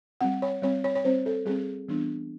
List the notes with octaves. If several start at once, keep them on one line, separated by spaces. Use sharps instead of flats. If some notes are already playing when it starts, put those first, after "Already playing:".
G3 C4 F#5
C#5
G3 C4 C#5
C#5
C#5
G3 C4 C5
A4
G3 C4 G#4
E3 G3 B3 D4